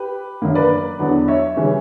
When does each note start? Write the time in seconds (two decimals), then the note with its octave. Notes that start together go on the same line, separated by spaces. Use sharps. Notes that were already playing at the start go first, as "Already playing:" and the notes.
Already playing: G4 B4
0.42 F#2 D3 A#3
0.55 B4 D5
0.99 E2 D3 F#3 B3 D4
1.28 C#5 E5
1.57 C#3 E3 G3 C#4